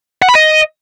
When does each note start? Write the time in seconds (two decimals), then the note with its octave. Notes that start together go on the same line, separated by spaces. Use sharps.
0.22 F#5
0.29 B5
0.35 D#5